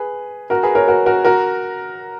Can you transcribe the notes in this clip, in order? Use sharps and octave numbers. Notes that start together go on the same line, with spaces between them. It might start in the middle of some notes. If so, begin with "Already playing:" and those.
Already playing: G#4 B4
F#4 A#4
G#4 B4
A#4 C#5
F#4 A#4
F#4 A#4
F#4 A#4